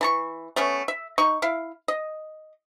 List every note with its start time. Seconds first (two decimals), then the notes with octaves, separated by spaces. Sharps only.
0.01 E3 A5 C#6
0.56 A3 B3 C#4
0.88 E5
1.18 D#4 C#6
1.42 E4 F5
1.88 D#5